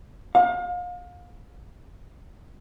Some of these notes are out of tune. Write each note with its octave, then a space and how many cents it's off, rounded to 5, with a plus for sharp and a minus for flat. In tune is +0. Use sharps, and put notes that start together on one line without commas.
F5 +35